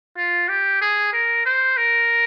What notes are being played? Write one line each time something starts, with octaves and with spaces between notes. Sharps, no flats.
F4
G4
G#4
A#4
C5
A#4